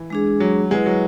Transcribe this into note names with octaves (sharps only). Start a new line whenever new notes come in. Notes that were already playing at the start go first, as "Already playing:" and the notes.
Already playing: E3
G#3 D4 G#4
F#3
G#3 E4 B4 F#5
F#3